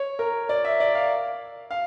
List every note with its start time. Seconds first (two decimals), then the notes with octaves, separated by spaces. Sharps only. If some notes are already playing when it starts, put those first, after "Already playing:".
Already playing: C#5
0.19 A#4
0.49 D5
0.64 E5
0.80 D5
0.95 F5
1.71 F5